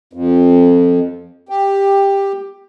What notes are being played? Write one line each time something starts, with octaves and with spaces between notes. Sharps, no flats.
F2
G4